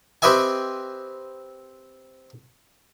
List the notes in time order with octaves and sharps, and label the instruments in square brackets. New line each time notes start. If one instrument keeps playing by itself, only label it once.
[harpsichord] C4 G4 B4 D#5 E5 G#5